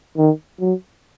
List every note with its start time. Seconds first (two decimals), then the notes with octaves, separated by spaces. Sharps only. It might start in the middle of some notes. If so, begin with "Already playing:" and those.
0.17 D#3
0.60 F#3